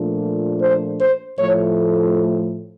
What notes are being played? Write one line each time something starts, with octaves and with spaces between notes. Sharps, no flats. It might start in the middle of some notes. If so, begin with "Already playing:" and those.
Already playing: A#2 F3 A3 D4
C5
C5
A2 F3 A3 C#5